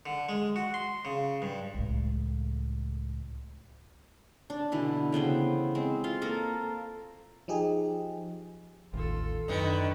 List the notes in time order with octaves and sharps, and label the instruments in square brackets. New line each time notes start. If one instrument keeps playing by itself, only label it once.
[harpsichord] D3
G#3
F#4
C6
C#3
G2
[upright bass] C#2 A2
[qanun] D4
B2 D3 E3 E4
C#3 B3 C5 G5
G#3 C4
F4 F5 C6
A#3 A4 A#4
[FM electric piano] F3 D#4 G4 G#4
[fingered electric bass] A1 D#2 [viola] F4 A4
[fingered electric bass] F#2 [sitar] D3 D#3 [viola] B4